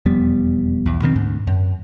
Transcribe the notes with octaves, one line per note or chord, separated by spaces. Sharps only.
E1 F2 G3 B3
B1 E2
B2 D#3 A#3 C4
D2 G#2
F#2